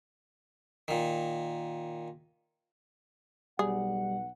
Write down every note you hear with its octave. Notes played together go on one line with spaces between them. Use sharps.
A#2 D#3
B1 G3 G#4 F#5